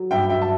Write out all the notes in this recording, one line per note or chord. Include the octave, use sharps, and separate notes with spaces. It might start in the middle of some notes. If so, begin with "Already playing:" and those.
Already playing: F#3
G2 E5 G5
F#3 E5 G5
A5